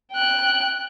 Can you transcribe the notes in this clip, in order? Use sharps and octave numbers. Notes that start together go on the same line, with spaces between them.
G5 F#6